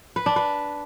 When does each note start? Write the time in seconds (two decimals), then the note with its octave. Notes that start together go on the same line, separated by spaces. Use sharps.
0.16 B4
0.26 D4
0.36 B4